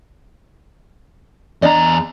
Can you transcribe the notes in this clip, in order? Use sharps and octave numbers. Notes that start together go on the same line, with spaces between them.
E2 D4 D5 D#5 A#5